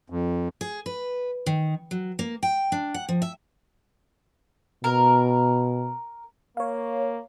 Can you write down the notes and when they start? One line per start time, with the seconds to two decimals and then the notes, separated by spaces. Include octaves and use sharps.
0.10 F2
0.61 G#4
0.86 B4
1.46 D#3
1.91 F#3
2.19 A#3
2.43 G5
2.72 D4
2.94 F#5
3.09 F3
3.22 E5
4.84 B2 A#4
6.57 A#3 C#5 F5